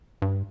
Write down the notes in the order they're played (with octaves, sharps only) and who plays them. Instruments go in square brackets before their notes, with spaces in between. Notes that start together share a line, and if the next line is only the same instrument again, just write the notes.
[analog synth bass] G2